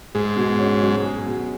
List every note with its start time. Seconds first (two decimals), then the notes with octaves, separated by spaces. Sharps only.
0.15 G#2 G#4
0.36 B2
0.59 C#4
0.82 F#3
1.04 G#4
1.26 B2